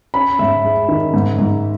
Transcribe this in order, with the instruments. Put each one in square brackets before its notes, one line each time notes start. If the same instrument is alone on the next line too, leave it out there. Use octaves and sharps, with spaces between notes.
[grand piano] C#4 B5
G#2 E5
G#3
D#3
G#2
G#2